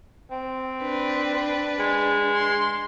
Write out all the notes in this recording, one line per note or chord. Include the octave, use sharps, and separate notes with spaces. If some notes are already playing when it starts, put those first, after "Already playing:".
C4
D4 B4
G#3
C6